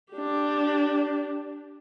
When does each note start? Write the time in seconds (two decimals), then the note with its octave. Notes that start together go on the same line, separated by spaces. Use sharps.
0.13 D4 G4